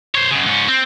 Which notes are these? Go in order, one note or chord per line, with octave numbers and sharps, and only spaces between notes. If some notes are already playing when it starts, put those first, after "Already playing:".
C5 C#5
F#2 C#3
G#2 C#4
C4